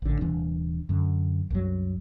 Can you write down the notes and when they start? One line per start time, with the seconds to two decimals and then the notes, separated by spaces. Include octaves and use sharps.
0.02 A1 D3
0.21 D#1 C3 E3 D4
0.89 F#2 D3
1.50 C2 F#2 F#3